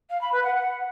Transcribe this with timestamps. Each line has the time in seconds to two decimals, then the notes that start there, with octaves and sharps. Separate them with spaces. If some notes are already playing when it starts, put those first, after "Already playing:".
0.10 F5
0.21 B5
0.32 B4
0.44 F#5
0.55 F#5